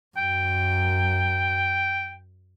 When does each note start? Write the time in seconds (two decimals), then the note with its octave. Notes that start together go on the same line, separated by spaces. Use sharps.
0.17 F#2 G5